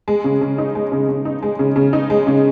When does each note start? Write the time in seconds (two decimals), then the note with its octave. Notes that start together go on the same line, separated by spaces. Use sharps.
0.08 G#3
0.24 C#3
0.41 C#3
0.58 D#4
0.75 G#3
0.92 C#3
1.09 C#3
1.25 D#4
1.42 G#3
1.59 C#3
1.76 C#3
1.93 D#4
2.10 G#3
2.27 C#3